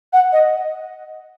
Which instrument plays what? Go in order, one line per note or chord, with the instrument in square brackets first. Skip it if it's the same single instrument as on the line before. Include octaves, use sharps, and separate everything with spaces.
[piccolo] F#5
D#5